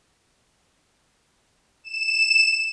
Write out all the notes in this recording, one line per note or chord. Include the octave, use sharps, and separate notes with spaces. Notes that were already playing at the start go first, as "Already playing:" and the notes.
E7